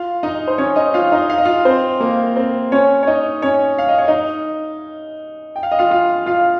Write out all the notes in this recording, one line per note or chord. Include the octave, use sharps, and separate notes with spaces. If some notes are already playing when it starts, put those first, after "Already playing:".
Already playing: F4 F5
D#4 D#5
C5
C#4 C#5
D#4 D#5
F4 F5
D#4 D#5
F5
D#5
F4 F5
C4 C5
A#3 A#4
C4 C5
C#4 C#5
C#5
D#4 D#5
C#4 C#5
F5
D#5
C#5
D#4 D#5
G5
F5
D#5
F4 F5
F4 F5
F4 F5